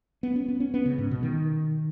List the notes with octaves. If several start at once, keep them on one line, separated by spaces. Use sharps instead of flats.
B3
C#4
B3
C#4
B3
C#3
G#2
B2
D#3